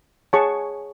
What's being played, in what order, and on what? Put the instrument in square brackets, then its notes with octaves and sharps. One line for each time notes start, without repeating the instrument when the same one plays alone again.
[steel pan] G#4 C#5 F#5 A5 C#6